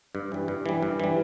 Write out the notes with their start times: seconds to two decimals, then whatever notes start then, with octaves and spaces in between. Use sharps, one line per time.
0.15 G2
0.32 E3 G3
0.48 G2
0.66 E3 G3
0.83 G2
1.00 E3 G3